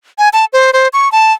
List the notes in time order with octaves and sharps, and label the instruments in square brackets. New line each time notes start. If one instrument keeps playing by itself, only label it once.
[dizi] G#5
A5
C5
C5
C#6
A5